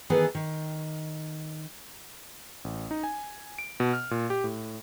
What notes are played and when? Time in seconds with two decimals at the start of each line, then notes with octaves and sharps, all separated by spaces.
0.10 D#3 E3 B3 G#4 A4 B4
0.35 D#3
2.64 A1
2.91 D#4
3.03 G#5
3.58 D7
3.80 B2
3.93 F6
4.11 A#2
4.30 G4
4.44 A2